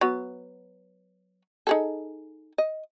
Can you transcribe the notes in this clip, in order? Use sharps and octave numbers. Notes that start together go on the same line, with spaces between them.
F#3 B3
D#4 G#4 A4
D#5